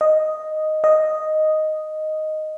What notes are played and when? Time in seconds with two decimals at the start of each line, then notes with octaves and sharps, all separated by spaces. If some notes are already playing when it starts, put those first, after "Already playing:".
0.01 D#5
0.84 D#5